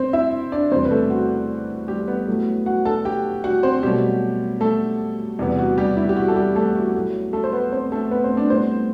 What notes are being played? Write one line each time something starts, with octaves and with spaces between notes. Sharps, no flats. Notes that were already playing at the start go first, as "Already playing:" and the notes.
Already playing: C4 C5
E4 E5
D4 D5
E2 C3 G3 C4 C5
B4
A3 A4
F#4
G3 G4
B3 B4
A2 F#3 A3
F#4 F#5
A4 A5
G4 G5
F#4 F#5
C4 C5
B2 F#3 G3 A3 G4
A3 A4
E2 C3 G3 B3
F#4
G3 G4
E4
G4
F#4
A4
G3 G4
A3 A4
F#4
A2 F#3 A3
A3 A4
C5
B3 B4
C4 C5
A3 A4
B3 B4
C4 C5
D4 D5
A2 G3 B3 C4 C5